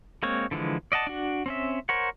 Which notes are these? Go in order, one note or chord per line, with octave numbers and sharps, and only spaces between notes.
G#3 A#3 C4 C#5
D3 E3 F3 G#3
D5 D#5 F#5 A5
D4 F#4
C4 C#4 E5
A#4 C5 C#5 F#5